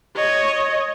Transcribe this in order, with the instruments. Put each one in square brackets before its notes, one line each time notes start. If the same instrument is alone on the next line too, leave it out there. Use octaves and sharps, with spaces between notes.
[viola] C#5 D#5